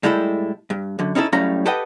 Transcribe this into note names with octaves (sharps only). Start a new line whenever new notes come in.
A2 G3 G#3 E4 A4
G2
F#2 D3
C#4 D#4 E4 G4 A4
F#2 A2 G3 C#4 F5 A#5
G4 A4 B4 D#5 F#5 G5